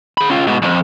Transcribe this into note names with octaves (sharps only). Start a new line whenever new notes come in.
G#4 B5
C#4 F4
G#2 B2
B1 F2